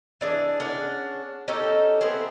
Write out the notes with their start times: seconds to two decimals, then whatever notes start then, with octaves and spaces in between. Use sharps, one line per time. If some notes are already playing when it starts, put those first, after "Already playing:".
0.21 E3 D4 G#4
0.60 C#4 D4 G#4 F#5
1.48 C#4 D#4 G4 A4
2.01 B3 C4 E4 G#4